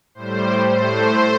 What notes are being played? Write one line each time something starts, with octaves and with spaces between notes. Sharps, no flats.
A2 G3 C5
A2 A3 C5